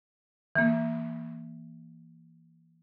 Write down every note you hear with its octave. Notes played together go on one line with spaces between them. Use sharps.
E3 A#3